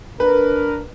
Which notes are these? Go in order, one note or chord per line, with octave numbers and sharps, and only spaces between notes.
D4 A#4 B4